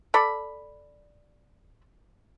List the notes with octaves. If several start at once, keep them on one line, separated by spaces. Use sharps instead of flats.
A4 D5 B5